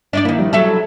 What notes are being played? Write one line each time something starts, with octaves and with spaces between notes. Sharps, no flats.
D4 D#4 D5
D#3 A#3 E4
F3 G3
F#3 E4 A4